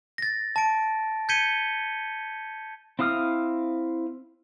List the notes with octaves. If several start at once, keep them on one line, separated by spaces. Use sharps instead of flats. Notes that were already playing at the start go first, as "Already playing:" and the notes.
A6 A#6
A5 D7
G6 G#6 B6 C#7 D#7 G7
C4 E4 F5 D#6 F6